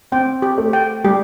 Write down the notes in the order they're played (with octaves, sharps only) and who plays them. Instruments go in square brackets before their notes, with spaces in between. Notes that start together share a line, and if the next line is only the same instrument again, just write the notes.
[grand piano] C4 [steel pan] G5
[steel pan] G4
[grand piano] A3
[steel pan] G5
[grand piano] G3 [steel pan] G4